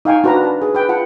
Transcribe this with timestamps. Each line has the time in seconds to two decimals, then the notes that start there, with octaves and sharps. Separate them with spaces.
0.05 D#4 F5 G5 G#5 C#6
0.24 D4 F#4 B4 C5 A#5
0.43 A5
0.62 G#4 B4
0.75 B4 G5
0.89 F4 F#5 A5